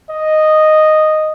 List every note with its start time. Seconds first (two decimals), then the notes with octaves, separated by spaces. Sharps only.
0.11 D#5